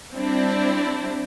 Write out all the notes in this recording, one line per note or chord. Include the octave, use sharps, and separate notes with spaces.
G3 C4 D4 E4